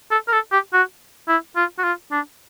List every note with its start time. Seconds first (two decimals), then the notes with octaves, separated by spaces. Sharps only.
0.11 A4
0.28 A#4
0.32 A4
0.52 G4
0.73 F#4
1.28 E4
1.56 F4
1.79 F#4
1.84 F4
2.12 D4